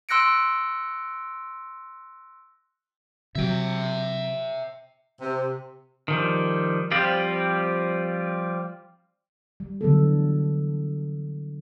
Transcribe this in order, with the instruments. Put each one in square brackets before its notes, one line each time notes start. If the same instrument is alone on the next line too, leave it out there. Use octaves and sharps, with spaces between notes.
[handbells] C6 E6 F#6 A#6 C#7 D7
[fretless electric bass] C3 F#3 [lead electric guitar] E5 G5
[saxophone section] C3
[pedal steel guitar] D#3 F3 G3
F3 G3 C4 F4 G4
[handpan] G3
D3 E3 F#3 A3 B3 A4